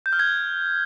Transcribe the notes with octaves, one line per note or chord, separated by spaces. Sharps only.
G6
F6
G#6